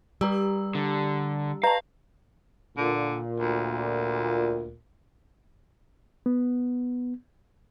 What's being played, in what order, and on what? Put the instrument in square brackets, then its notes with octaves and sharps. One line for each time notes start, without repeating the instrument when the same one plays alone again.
[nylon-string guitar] G3 [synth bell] G4 A#5 E6
[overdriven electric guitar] D3
[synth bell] B4 A5 [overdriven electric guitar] F5 [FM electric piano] A#5
[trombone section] A#2 [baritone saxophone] D3
[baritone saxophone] D2
[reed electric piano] B3